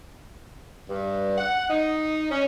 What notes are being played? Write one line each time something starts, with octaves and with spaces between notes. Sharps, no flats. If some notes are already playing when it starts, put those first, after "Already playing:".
G2
F#5
D#4
C#4